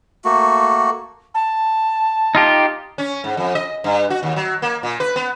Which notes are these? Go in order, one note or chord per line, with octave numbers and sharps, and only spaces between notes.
A3 A#3 F#4
A5
D#4 F4 G4
C#4
G#2
F2
D#5
G2
F#4
D#2
F#3
A#3
A#2
B4
B3